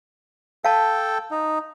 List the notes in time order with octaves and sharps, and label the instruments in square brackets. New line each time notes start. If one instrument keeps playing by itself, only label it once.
[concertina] A4 G5 [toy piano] F5 A5
[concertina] D#4